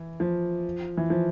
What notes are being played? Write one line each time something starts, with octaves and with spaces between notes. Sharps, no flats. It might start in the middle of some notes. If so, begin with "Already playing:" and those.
Already playing: E3
F3
E3
F3